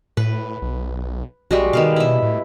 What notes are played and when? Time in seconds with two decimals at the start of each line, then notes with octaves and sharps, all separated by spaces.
0.17 A2 B4
0.62 B1
1.51 A#1 G3 G#3 F#4
1.73 B2 D#3 B3 F5
1.96 B2 E4 E5
2.22 A2